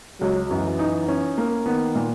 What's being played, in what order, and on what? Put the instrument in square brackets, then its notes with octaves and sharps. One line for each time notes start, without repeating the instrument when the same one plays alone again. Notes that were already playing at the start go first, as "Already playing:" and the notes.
[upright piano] C#2 [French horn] F#3
[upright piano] F#2 [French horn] E3
[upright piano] D#4
C#4
A#3
[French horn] D#3 [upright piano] B3
[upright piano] A#2